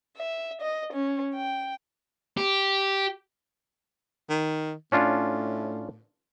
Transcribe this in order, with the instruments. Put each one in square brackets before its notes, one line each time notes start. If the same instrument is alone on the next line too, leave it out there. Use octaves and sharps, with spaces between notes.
[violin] E5
D#5
C#4
G5
[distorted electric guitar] G4
[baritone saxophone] D#3
[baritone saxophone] A2 [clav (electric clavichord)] C#4 D4 F4